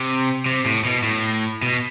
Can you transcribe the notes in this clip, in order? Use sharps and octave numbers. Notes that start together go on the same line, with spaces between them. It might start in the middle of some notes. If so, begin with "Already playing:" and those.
Already playing: C3
C3
A2
B2
A2
B2